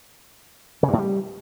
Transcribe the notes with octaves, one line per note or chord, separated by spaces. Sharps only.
C#3
G2
A2
G3